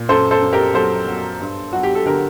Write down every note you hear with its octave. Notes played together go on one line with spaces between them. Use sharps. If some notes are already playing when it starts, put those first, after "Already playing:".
Already playing: A#2
F#2 A4 C5
A4 C5
F#2
G4 A#4
F#3 A4 C5
F#3
G2
F#3 F#4
G4
A4
D3 G4 A#4